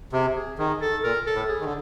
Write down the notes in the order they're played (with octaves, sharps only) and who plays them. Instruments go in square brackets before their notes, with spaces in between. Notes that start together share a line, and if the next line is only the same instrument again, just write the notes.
[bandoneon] C3 [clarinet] G#4
[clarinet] G#4
[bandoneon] D#3 [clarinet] G#4
[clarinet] A4
[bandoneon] A#2 [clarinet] A#4
[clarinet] A4
[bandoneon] A2
[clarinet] G#4
[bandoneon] D#3
D3